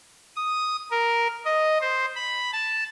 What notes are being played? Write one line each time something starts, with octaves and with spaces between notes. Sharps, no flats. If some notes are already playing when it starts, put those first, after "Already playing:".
D#6
A#4
D#5
C5
B5
A5